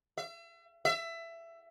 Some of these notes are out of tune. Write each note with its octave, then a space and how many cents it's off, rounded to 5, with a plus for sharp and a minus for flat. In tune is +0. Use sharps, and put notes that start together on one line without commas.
E5 +40
E5 +20